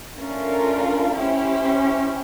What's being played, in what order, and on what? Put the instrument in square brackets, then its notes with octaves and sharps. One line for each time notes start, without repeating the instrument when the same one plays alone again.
[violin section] A3 D4 F4 A#4 [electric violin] C#4
[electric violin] C#4 [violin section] E4 G4 C5
[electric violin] C#4